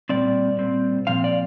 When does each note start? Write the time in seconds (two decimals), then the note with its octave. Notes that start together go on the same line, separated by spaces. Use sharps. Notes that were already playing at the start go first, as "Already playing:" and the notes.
0.09 A#2 G3 C4 D5
0.59 A#2 G3 C4
1.07 A#2 F3 C4 F5
1.24 D5